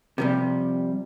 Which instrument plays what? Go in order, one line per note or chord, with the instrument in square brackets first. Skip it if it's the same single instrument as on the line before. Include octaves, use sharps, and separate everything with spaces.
[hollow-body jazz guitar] C3 F3 G3